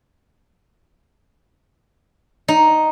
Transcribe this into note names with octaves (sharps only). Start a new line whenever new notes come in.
D#4